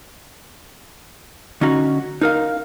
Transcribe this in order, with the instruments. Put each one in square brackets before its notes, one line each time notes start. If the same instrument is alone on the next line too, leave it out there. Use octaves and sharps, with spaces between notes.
[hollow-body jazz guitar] D3 C#4 D#4 F#4
D#4 A#4 F5